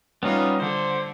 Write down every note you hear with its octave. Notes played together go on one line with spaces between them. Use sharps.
G3 B3 C#4 D#4 F4
D3 C5